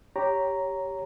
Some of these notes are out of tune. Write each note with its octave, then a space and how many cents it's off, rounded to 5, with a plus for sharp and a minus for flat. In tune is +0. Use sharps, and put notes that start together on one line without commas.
G4 +0 C#5 +5 A#5 +0